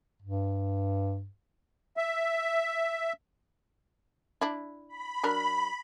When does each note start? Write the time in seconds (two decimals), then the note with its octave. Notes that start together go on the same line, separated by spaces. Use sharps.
0.22 G2
1.97 E5
4.41 D4 E4
4.88 B5
5.23 F#3 D4 A#4